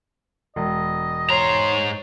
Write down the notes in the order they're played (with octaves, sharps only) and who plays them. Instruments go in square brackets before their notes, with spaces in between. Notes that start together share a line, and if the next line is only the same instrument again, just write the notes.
[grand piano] E1 [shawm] D#5
[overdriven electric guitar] G#2 A#5 [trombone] C#5 [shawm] C6